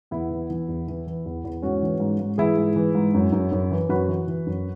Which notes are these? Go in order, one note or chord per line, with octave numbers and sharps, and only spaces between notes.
E2 B3 E4
E3
E3
E2
E3
E3
E2
E2
G#2 C#4 F#4
E3
G#2
G#2
E3 E4 G#4
G#2
E3
G#2
F#2
F#2
F#2
E3
F#2 F#4 B4
E3
E3
F#2